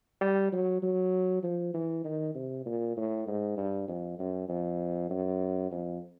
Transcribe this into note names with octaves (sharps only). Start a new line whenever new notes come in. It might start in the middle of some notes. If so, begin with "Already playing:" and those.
G3
F#3
F#3
F3
E3
D#3
C3
A#2
A2
G#2
G2
F2
F#2
F2
F#2
F2